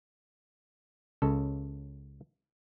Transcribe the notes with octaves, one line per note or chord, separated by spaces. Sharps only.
C#2 C#3 A4